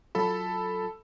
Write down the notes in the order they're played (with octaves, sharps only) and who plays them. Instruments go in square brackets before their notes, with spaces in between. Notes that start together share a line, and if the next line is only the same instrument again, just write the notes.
[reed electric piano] F#3 F4 [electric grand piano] A4 B5